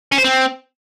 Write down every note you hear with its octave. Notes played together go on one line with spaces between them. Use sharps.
C#4
C5
C4